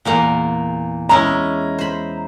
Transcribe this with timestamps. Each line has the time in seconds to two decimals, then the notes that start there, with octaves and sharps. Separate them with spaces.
0.05 E2 A#2 A#3
1.09 G#3 C#4 E4 A#5
1.79 C5 B5